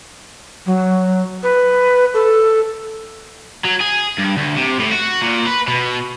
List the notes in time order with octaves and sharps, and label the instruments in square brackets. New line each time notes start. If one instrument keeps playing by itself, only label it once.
[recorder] F#3
B4
A4
[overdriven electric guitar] F#3
G#4
G2
D2
C3
A2
F#4
A#2
B4
B2